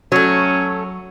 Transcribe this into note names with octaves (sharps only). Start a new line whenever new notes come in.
F#3 A3 C#4 C#5